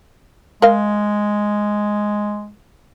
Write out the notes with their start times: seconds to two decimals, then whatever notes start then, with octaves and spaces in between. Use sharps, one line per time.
0.62 G#3 A#4 D#5 F5